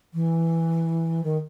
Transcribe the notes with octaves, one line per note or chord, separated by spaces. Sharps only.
E3
D#3